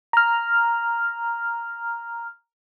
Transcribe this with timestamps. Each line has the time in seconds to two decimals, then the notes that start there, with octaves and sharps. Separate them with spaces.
0.13 A#5 F6